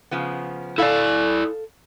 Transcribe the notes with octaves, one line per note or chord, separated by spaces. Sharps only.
C#3 F3 B3
E4 A4 D5 F5